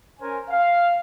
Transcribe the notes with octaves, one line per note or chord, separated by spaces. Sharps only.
C#4 A#4 C5 G#5
F5